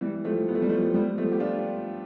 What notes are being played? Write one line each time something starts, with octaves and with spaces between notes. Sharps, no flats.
E3 G3
F3 A3
B3
A3
G3
F3 A3
G3 B3
F3 A3
G4
D4 F4